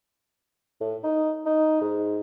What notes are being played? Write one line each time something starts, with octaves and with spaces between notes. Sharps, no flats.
A2
D#4
D#4
G#2